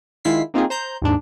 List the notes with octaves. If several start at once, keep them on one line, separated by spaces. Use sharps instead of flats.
D#3 G#3 E4 F4 B6 C7
A#3 C4 D#4 F4 G4 G#4
C5 A#5 G6
D#2 G#2 D4